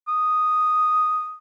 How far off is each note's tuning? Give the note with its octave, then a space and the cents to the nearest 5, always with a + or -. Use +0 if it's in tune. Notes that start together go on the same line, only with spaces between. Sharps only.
D#6 +0